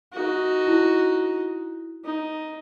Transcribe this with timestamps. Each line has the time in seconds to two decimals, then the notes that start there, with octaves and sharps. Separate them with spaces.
0.13 D#4 F#4
0.67 E4
2.05 D#4